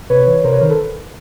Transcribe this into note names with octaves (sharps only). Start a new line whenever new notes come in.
C3 B4 C#5
E3
C3 A#4 C5
B4 C#5
D#3 A#4 C5
A4 B4